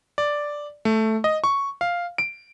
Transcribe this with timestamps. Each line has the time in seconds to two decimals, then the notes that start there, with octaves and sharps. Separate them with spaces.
0.18 D5
0.85 A3
1.24 D#5
1.44 C#6
1.81 F5
2.18 D7